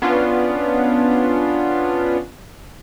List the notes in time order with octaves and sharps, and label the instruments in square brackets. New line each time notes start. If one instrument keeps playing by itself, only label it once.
[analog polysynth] B3 C#4 D4 F4